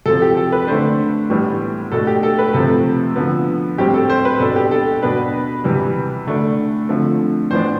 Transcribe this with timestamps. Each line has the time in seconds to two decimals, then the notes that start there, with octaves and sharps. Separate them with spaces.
0.06 C3 F3 C4 A4
0.22 G4
0.37 A4
0.52 B4
0.67 D3 A3 D4 C5
1.30 A2 E3 G3 B3
1.92 B2 A3 D4 A4
2.07 G4
2.23 A4
2.39 B4
2.53 C3 F3 A3 C4 A4
3.16 D3 F3 B3
3.78 A2 G3 C4 G4
3.94 A4
4.10 C5
4.25 B4
4.40 B2 B3 D4 A4
4.56 G4
4.71 A4
5.02 B2 B3 D4 B4
5.64 C3 E3 G3
6.27 D3 A3 D4
6.89 D3 F3 A3 C4
7.50 A2 E3 B3 D4 C5